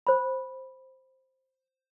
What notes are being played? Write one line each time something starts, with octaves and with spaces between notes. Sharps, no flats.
C5 B5